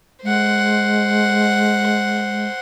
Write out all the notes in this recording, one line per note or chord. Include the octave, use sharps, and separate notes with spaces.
G#3 C5 F#5